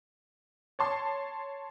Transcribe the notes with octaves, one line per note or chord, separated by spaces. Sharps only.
C#5 A5 C6